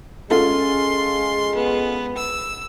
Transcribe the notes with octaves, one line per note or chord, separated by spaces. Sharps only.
G#3 C#4 F4 A4 C6
B3
E6